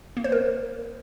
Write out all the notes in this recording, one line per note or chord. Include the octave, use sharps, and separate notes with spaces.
A#3
C5
A#4